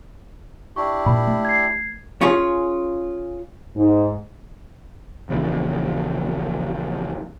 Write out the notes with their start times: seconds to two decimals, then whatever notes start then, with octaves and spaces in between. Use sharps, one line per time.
0.76 D4 E4 G4 C#6
1.06 A#2 B5
1.27 A3
1.45 G#6 C7
2.21 C#4 F4 G#4
3.76 G#2
5.29 A#1 D#2 C#3 E3